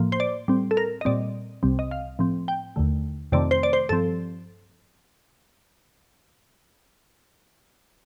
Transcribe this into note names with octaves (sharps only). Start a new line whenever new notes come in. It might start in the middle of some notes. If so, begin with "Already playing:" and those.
Already playing: A2 F3 A#3
C5
D5
A2 G3 C4
A4
A#4
D#5
A#2 G3 C4 D5
C2 C3 G3 C4
D#5
F5
A2 F3 C4
G5
D#2 D3 A3
F2 C3 D#3 A3 C4 D5
C5
D5
C5
G2 F3 C4 A4